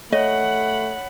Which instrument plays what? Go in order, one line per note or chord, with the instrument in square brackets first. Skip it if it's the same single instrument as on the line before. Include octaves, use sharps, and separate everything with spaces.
[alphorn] A3 [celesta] C#5 [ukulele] D#5 [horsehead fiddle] F#5 B5